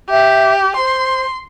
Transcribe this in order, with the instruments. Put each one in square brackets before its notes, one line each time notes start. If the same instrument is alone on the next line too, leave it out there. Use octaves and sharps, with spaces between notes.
[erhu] G4 [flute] E5
[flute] C5 [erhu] C6